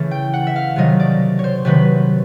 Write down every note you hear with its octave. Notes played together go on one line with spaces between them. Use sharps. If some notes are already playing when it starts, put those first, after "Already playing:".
Already playing: C#3 E3 A3
G5
F#5
E5
F5
C3 D#3 F#3 A3 D#5
D5
C#5
C5
C3 D#3 F#3 A3 B4